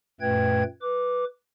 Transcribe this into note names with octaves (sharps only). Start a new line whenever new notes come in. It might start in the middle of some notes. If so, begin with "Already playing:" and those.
F#2 A#2 A3 B4 G5 G#6
B4 D6